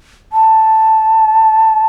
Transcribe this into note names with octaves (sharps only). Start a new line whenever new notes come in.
A5